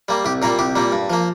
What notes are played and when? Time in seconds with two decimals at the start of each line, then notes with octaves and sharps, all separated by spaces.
0.08 G3 A#3
0.25 C2 G4
0.42 A#2 G3 A#3 A#4
0.59 C2 G4
0.75 A#2 G3 A#3
0.92 G2
1.10 F3 A#3